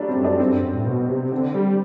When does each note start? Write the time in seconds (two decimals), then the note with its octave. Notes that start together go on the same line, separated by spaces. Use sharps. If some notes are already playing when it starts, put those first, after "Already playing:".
Already playing: F#3 G3 A3 D4
0.09 C4
0.16 F#2
0.24 D4
0.39 G2 C4
0.52 F#2
0.63 F#2
0.74 A2
0.86 B2
1.08 C3
1.32 D3 C4
1.55 G3